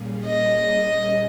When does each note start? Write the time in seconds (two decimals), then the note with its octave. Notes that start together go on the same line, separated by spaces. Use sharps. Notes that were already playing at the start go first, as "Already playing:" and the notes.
Already playing: A#2 G3 A#3 C#4 G#4
0.25 D#5